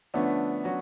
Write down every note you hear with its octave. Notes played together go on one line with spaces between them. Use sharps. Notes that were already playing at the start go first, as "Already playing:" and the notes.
D3 F3 A3 B3 C#4 D4
F#3 C#4 F#4